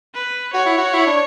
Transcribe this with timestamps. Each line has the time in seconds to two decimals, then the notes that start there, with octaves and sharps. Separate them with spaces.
0.14 B4
0.54 F#4 C#5
0.65 E4
0.78 F#4
0.93 E4
1.06 D4